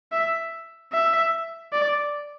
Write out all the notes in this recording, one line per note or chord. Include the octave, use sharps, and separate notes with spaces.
E5
E5
D5